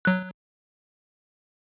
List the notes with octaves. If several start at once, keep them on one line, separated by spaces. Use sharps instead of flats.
F#3 F#6